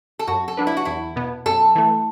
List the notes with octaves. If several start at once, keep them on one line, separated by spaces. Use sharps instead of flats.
A4
F#2 F#4
A4
F#3 D4 B4
E4
F#4
E2 E4
B2 B3
F#2 A4
E3 A3